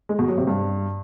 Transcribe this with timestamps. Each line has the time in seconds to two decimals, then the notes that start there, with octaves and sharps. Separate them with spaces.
0.09 G#3
0.19 B2
0.28 F#3
0.38 C3
0.47 G2